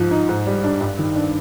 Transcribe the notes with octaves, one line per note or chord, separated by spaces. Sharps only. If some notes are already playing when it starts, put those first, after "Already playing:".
Already playing: G#2 F3
D#4
G#2
G3
D4
G2
D#3
D4